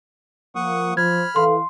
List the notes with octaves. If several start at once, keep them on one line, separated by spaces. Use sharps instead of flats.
F3 A#3 F#5 C#6 D#6
F3 C5 B5 F6 G#6
E3 A4 F5 C6